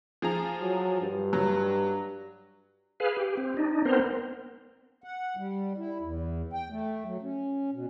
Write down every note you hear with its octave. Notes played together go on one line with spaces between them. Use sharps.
F3 G#4 A#5
F#3
G2
F#3
G#4 B4 F5
G4
C4
D4 D#4
B3 C4 A#4 C5
F#5
G3
E4
E2
G5
A3
F#3
C#4
B2